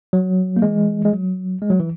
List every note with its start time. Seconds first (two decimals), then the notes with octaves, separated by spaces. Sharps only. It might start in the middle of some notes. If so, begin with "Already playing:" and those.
0.13 F#3
0.56 A#3
0.62 E3 G#3
1.05 G#3
1.13 F#3
1.62 G#3
1.70 F#3
1.80 E3